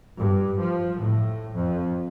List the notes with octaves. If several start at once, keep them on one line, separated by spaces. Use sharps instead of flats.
G2
F3
A2
F2